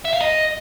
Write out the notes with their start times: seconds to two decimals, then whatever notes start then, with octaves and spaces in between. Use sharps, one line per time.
0.05 E5
0.13 F5
0.22 D#5